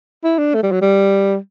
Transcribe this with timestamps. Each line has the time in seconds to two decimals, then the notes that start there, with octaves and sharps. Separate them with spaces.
0.24 E4
0.38 D4
0.54 A3
0.63 G3
0.72 F#3
0.82 G3